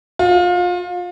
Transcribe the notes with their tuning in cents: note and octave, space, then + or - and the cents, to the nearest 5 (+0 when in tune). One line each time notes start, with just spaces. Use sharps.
F4 +30